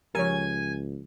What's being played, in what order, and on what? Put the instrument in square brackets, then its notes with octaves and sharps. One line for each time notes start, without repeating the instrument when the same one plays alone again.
[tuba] C#2 [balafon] F3 G4 [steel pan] A#4 C#5 [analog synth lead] G#5